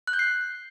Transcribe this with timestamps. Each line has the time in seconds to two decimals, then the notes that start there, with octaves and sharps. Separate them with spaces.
0.07 F#6
0.13 G6
0.19 C7